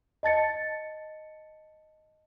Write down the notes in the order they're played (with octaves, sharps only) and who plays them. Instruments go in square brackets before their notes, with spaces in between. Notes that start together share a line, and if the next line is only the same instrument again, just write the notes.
[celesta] D#5 A5 A6 C#7